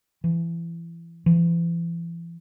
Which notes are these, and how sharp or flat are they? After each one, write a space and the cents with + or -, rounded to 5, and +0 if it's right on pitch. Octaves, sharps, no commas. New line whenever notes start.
E3 +30
E3 +40